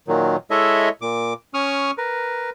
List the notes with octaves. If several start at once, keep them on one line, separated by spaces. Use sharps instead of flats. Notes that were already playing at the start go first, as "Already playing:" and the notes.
A#2 D#3 F#3
G#3 E4 A4 C#5 D#5 E5
A#2 D6
C#4 C#6 D#6 F6
A#4 B4